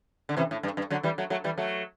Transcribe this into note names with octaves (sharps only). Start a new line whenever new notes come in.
D3
C3 E3
A2
G2
G2
D3 F#3
E3 G3
F#3 A3
F#3 A3
E3 G3
F#3 A3